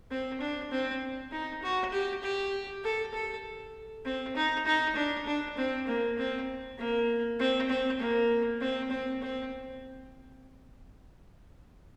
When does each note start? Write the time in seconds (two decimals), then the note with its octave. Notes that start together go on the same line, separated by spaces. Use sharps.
0.10 C4
0.40 D4
0.71 C4
1.31 D#4
1.62 F#4
1.92 G4
2.23 G4
2.84 A4
3.13 A4
4.05 C4
4.36 D#4
4.66 D#4
4.95 D4
5.26 D4
5.57 C4
5.87 A#3
6.18 C4
6.78 A#3
7.39 C4
7.69 C4
8.00 A#3
8.61 C4
8.90 C4
9.22 C4